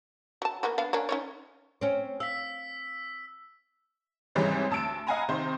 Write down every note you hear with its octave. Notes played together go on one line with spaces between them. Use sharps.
F#3 A5
A#3 B3 F#4
B3 D4 F5
A#3 C#4 D4
C#4 D#4 C#5
C4 C#4
F5 E6 B6
G#2 C3 E3 G3 G#3 C#4
D2 A5 E6 D7
D#5 F5 F#5 G#5 A#5 B5
C3 D#3 C5